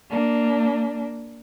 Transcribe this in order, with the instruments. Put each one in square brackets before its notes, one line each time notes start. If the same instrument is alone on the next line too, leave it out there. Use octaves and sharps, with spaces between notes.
[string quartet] A#3 D4